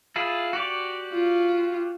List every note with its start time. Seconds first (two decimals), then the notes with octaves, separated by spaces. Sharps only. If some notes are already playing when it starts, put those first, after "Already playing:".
0.16 E4 F4 G#4
0.53 F#4 G4 D5
1.13 F4